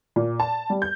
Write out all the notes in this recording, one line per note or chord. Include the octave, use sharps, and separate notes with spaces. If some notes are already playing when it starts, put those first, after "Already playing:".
A#2
A5
G3
G6